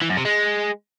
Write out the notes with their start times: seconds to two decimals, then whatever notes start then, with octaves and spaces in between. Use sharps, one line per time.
0.02 E3
0.09 F#2
0.17 C3
0.25 G#3